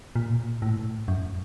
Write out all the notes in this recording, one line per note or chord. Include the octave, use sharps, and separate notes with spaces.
A#2
A2
F#2